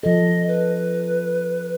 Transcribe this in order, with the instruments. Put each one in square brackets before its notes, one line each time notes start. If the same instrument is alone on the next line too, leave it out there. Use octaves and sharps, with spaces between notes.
[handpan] F3 A4 [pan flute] D#5
[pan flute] B4